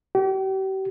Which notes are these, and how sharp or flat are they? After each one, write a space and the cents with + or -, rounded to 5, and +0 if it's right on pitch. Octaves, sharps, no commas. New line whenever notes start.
G4 -40